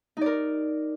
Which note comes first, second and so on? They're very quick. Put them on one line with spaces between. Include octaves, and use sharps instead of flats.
D#4 D5 A#4